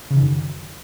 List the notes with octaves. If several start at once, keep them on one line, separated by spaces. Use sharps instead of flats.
C#3
D#3
F#2